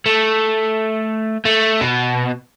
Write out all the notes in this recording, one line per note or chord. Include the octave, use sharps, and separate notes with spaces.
A3
A3
B2